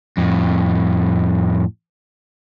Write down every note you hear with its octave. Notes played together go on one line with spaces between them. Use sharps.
F2 A2